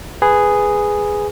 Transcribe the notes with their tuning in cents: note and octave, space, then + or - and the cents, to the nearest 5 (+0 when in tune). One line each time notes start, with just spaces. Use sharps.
G#4 -5 B4 +10